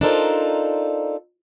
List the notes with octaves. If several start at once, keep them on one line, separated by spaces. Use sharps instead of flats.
D4 D#4 F4 A4 A#4 C5